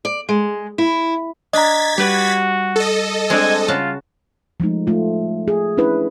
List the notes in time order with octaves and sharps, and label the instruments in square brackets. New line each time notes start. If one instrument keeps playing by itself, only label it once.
[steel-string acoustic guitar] D5
G#3
E4
[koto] D4 [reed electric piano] D#5 A#5 [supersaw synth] G#6 A6 B6
[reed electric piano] G3 [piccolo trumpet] F#4 [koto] G4 B4 D5
[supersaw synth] A4 D#5
[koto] G#3 C4 D4 [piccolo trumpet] G#5
[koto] C#3 F#4 A5 [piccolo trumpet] F4
[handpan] F3 G#3 A3 D#4
A3 F4
G#4
C#4 D4 E4 B4